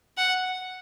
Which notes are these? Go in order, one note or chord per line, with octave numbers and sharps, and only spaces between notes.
F#5